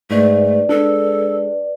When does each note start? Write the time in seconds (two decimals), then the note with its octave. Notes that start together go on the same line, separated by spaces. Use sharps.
0.10 G#2 A3 B4 D5
0.69 G#3 D4 A4